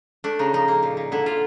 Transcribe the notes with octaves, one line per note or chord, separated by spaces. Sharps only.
A3 D4
C#3 D#4
F3 D#4
A#3
A#2
A#2
D3 E4
D3 F4